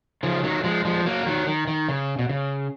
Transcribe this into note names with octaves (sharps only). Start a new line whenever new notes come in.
C#3 F3
D#3 F#3
F3 G#3
F3 G#3
F#3 A#3
D#3 F#3
D#3
D#3
C#3
B2
C#3